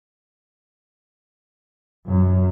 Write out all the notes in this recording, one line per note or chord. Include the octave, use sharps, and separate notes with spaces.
F#2